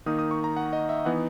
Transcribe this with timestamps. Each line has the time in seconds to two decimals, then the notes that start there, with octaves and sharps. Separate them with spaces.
0.06 D#3 A#3 D#4 D#6
0.19 D#6
0.31 C#6
0.44 A#5
0.57 F#5
0.73 D#5
0.89 E5
1.05 E3 B3 D#4 F#5